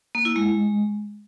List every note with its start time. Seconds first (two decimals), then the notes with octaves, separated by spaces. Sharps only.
0.15 A#3
0.25 E4
0.36 G#3